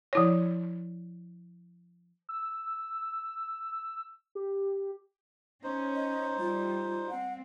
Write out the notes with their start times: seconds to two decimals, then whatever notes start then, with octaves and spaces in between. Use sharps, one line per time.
0.13 F3 E4 C#5
2.29 E6
4.35 G4
5.63 C#4 D#4 C5
5.95 D#5
6.40 G3 F4
7.10 C4 F#5